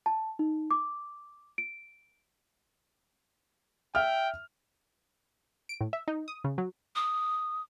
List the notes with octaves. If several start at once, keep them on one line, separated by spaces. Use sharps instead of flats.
A5
D#4
D6
D7
E5 G5 F6
D7
A2
E5
D#4
D#6
C#3
F#3
D#6